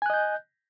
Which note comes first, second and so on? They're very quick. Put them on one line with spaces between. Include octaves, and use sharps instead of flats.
G#5 F#6 D#5 G6